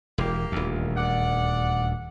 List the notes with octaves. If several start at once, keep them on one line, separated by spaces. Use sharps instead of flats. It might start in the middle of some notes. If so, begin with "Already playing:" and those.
E1 A#3 G4
D#1 D2
D5 F#5